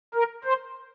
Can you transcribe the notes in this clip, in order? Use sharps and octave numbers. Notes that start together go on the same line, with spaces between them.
A#4
C5